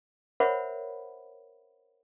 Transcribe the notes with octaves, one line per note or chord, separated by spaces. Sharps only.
A#4 C5 C#5 E5 F#5 B5